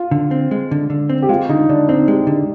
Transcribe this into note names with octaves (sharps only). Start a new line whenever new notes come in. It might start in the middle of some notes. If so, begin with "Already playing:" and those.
Already playing: F4
D3
C4
G#3
D3
D3
C4
G4
G#3 F4
D3 D#4
D3 D4
C4 D#4
G#3 G4
D3